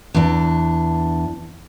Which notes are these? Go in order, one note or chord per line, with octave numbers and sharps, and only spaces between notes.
E2 D4